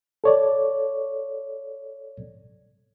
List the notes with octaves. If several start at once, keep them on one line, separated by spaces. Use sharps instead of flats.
A4 C#5 D5